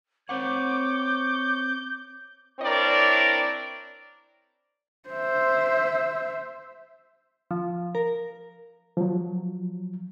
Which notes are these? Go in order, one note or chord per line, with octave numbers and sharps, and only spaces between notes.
C4 C5 C#5 F#5 D6 G6
C4 D4 E4 A#4 C#5 D5
C5 E5
F3
A#4
F3 F#3